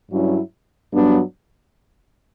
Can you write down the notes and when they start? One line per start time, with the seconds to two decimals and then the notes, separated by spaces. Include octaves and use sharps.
0.12 G2 F#3 C#4 E4
0.92 G2 F#3 B3 D4